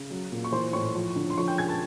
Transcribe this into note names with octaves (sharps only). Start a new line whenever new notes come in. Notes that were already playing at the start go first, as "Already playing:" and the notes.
Already playing: C#3
F#3
A#2
C#6
E3 C5 C6
A2 C#5 C#6
F3
D3
C6
F3 C#5 C#6
G5 G6
C#3 G#5 G#6
A5 A6